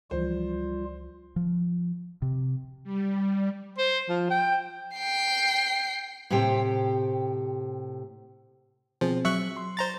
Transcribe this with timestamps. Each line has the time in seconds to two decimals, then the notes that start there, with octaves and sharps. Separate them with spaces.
0.11 C#2 E3 F3 G3 F4 C5
1.36 F3
2.22 C3
2.84 G3
3.79 C5
4.09 F3
4.31 G5
4.96 G5 C7
6.30 A2 C3 G4 C5 G5
9.01 B2 F3 C4 G#4
9.25 F#3 E5 C#6 F#6
9.57 C6
9.77 C5 A#5 A6